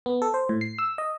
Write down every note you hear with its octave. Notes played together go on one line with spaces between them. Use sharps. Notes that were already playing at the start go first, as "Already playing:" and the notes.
B3
A4
C5
A2
C7
E6
D#5